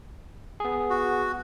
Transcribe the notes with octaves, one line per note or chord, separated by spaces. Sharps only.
B3 G#4
F#4